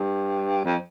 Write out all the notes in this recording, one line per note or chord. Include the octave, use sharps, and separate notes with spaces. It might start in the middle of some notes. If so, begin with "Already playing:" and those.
Already playing: G2
F2